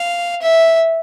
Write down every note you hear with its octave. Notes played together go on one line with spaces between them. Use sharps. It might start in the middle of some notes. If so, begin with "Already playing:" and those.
Already playing: F5
E5